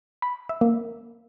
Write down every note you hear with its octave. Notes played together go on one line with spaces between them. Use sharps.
B5
E5
A#3